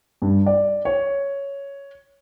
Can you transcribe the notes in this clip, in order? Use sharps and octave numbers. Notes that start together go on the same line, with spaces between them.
G2
D5
C#5